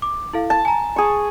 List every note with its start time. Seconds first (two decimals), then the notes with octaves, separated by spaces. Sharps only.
0.02 D6
0.33 E4 A4 F5
0.50 A5
0.65 G#5 A#5
0.96 G#4 C#6